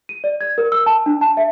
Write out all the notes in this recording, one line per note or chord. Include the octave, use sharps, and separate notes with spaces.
D#7
D5
G#6
A#4
E6
A5
D4
A5
E5